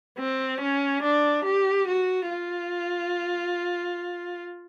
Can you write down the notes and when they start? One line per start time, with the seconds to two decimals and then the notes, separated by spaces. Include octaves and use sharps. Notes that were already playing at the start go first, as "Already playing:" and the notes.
0.18 C4
0.61 C#4
1.02 D4
1.45 G4
1.88 F#4
2.29 F4